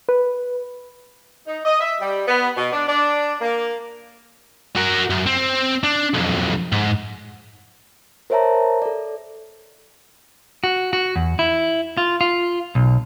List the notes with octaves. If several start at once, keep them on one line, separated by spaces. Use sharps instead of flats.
B4
D#4
D#5
E5
G3
B3
B2
D4
D4
A#3
F#4 A#4
F#2
C4
D4
B1 F2
G#2
A#4 C5 C#5 E5 A5 A#5
A4 D5
F#4
F#4
E2
E4
F4
F4
B1